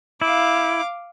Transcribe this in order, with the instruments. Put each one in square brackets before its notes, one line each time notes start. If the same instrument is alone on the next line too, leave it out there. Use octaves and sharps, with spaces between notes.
[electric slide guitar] E4 [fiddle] F5 D6